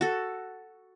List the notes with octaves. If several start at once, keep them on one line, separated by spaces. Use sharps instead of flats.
F#4 A4